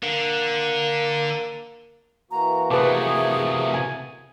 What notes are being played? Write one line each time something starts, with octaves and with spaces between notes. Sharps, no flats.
D3 A#3
E3 A#3 F#4 A#5
C3 A3 G#4 B4 A5 D6
G#5